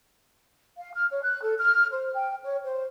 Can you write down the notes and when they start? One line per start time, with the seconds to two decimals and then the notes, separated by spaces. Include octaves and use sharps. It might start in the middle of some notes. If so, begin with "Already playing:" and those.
0.78 F5
0.94 F6
1.10 C#5
1.22 F#6
1.42 A4
1.58 F6
1.90 C5
2.14 G5
2.43 C#5
2.64 C5